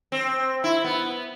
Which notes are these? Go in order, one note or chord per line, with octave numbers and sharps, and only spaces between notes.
C4
E4
B3